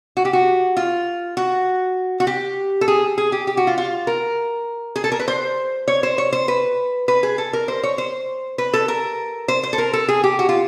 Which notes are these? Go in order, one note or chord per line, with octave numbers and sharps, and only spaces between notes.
F#4
G4
F#4
F4
F#4
F#4
G4
A4
G#4
G#4
G4
G4
F#4
F4
F4
A#4
G#4
A4
A#4
B4
C5
C#5
C5
C#5
C5
B4
B4
G#4
A4
A#4
C5
C#5
C5
B4
A4
A#4
C5
C5
A4
A#4
A4
G#4
G4
F#4
F4